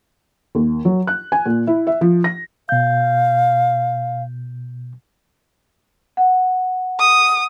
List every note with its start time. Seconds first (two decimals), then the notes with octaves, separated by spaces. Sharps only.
0.55 D#2
0.85 F#3
1.07 F#6
1.32 G#5
1.46 A#2
1.67 E4
1.87 E5
2.01 F3
2.24 A#6
2.69 B2 F5 G6
6.17 F#5
6.99 D#6